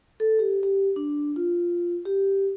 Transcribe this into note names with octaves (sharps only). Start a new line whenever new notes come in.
A4
G4
G4
D4
F4
G4